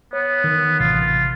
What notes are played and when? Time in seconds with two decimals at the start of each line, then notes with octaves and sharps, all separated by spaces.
0.13 B3 C#5
0.44 D#3
0.80 A1 C3 F4